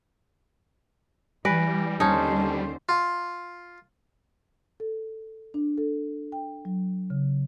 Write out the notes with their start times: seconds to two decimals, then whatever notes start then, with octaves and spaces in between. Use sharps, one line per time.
1.45 E3 G3 B4 G#5 A#6 D7
2.00 D#2 D3 C#4 D#4 C5 A5
2.89 F4
4.80 A4
5.54 D4
5.78 A4
6.32 G5
6.65 F#3
7.10 C#3